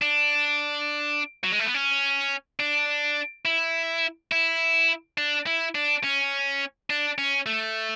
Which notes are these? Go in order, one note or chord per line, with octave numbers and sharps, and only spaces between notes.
D4
F#3
G#3
A3
B3
C#4
D4
E4
E4
D4
E4
D4
C#4
D4
C#4
A3